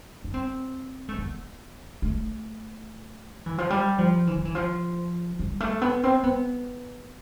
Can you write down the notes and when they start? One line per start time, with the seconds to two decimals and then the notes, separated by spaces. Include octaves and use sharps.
0.24 D4
0.34 C4
1.09 A3
1.18 B3
2.02 A3
3.46 E3
3.58 F3
3.70 G3
3.98 F3
4.27 E3
4.36 F3
4.45 E3
4.55 F3
5.39 G3
5.60 A3
5.82 B3
6.03 C4
6.23 B3